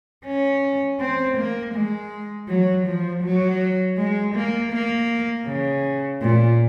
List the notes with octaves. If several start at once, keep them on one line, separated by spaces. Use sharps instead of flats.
C#4
C4
A#3
G#3
F#3
F3
F#3
G#3
A#3
A#3
C#3
A#2